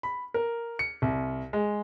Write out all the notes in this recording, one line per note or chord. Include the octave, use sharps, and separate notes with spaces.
B5
A#4
C#7
C2
G#3